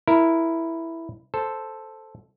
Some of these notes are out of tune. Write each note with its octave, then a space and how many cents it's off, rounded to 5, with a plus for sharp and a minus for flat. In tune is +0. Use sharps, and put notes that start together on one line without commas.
E4 +0 A#4 +0
A4 +0 C5 +0